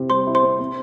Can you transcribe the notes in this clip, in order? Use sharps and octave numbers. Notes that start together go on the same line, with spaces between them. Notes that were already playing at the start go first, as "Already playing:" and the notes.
Already playing: C3 C4 E4
G3 C5 C6
E4
C5 C6
C4
C4